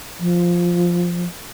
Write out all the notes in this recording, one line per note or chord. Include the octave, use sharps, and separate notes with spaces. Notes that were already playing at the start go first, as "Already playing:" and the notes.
F3